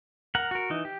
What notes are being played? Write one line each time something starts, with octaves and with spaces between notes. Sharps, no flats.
A#4 F#5
F#4 A#4
E3 D#4
G4